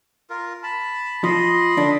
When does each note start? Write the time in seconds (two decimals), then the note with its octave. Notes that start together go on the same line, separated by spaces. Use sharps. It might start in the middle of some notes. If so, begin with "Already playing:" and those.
0.30 F4 A#4
0.63 A5 B5
1.24 F3 D#5 B5 C6
1.77 D3 D4